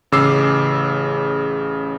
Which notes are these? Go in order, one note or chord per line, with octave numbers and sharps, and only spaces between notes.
A1 C#3 D6 E6 C7